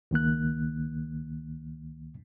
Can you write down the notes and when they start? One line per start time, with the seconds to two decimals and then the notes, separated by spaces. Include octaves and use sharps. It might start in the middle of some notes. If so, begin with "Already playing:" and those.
0.11 C#2 D#3 A#3 F#6